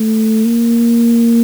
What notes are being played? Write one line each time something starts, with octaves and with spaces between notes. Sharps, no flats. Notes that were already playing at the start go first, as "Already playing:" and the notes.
Already playing: A3
A#3